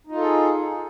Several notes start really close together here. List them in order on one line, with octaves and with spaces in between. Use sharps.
D#4 F4 A4 G#4